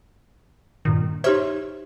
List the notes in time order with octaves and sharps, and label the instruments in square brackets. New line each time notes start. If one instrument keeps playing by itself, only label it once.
[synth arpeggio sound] G2 A#2 D#3
[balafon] D#4 G4 C5 [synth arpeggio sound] C#5 E5